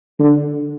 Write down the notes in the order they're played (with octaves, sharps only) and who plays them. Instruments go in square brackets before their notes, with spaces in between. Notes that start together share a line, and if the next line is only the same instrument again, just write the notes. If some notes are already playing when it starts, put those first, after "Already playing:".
[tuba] D3